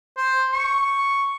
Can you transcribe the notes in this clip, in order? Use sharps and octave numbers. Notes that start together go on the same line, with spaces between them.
C5
C#6